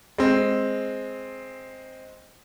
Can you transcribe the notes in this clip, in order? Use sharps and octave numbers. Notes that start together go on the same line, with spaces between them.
G#3 C4